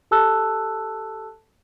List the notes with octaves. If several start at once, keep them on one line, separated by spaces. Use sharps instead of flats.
G4 A4 A5 E6 F#6